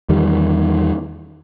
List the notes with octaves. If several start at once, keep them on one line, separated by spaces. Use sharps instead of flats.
E2 D#3 G3